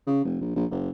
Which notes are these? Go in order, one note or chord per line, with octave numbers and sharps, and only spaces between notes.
C#3
F1
A#1
A#1
F#1